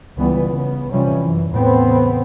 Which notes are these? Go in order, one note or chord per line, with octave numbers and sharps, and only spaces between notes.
C#2 C#3 E3 G3 B3
C#3 B3
C3 E3 F3 G3 C#4
F#2 E3
E2 A2 C#3 B3 C4